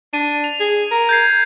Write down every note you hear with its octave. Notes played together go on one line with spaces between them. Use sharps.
D4 D#7
F7
G#4
A#4
G6 G#6 C7